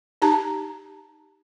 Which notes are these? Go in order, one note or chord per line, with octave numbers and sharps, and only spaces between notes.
D#4 G4 A5 A#5